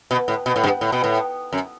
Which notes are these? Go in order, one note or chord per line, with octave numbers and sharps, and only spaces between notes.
B2
A2
B2
A2
G2
A2
B2
A2
F#2